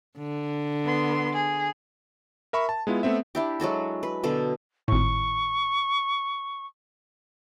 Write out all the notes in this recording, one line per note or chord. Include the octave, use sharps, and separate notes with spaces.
D3
B3 C6
G#4
A#4 E5 B5 C#6
A5
G#3 B3 E4 F4
A3 B3 C4 E5
D4 E4 G4
F#3 G#3 F#4 A4
B4
B2 D3 A4
G#1 A2 C#6